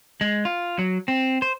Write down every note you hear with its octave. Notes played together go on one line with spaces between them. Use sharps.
G#3
F4
F#3
C4
C5